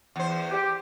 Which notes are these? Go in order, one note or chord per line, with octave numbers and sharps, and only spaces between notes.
E2 C5
G4